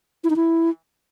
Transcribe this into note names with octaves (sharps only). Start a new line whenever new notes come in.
E4
D#4
E4